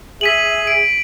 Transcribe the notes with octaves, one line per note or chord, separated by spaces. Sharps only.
G#4 E5 B6 D#7 F#7
D7